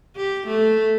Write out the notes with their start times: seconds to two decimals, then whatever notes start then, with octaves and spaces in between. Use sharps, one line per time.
0.17 G4
0.47 A3